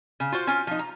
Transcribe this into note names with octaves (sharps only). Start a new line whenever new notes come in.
C#3
F4 F#4 C5
C#4 F4
F3 D#4
A#5